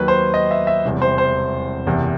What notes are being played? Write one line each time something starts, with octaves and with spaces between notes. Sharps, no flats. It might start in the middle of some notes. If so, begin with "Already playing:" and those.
Already playing: D#2 D#3 F#3 B4
C5
D#5
E5
E5
E1 E2 C3 E3 G3
C5
C5
F#1 E2 C3